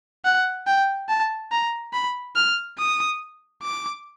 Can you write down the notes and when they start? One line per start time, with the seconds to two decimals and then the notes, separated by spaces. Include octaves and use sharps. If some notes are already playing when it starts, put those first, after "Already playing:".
0.25 F#5
0.67 G5
1.09 A5
1.52 A#5
1.93 B5
2.36 F6
2.78 D#6
3.63 D6